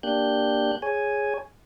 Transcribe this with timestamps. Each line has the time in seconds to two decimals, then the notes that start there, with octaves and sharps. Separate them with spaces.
0.03 A#3 D4 G4 F#6 G6
0.82 G#4 C#5 G#5